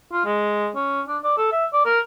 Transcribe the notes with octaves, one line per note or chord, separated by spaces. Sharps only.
F4
G#3
C#4
D4
D5
A4
E5
D5
A#4